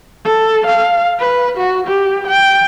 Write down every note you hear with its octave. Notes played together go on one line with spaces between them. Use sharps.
A4
F5
B4
F#4
G4
G5